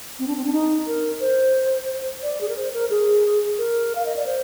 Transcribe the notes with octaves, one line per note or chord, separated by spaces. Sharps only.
C4
D4
C4
D4
D#4
A#4
C5
D5
G#4
A#4
C5
A#4
G#4
A#4
F5
D#5
D5
C5